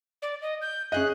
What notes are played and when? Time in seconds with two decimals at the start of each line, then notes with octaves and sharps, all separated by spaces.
0.22 D5
0.42 D#5
0.61 G6
0.92 C#4 G#4 D#5 F#6